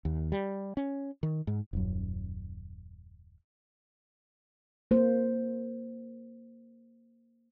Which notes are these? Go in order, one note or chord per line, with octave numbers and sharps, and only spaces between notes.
D#2
G3
C#4
D#3
G#2
D#1 F#2
A#3 C5